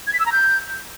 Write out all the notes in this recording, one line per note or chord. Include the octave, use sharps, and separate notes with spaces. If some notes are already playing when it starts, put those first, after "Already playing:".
G#6
B6
E6
A#5
G6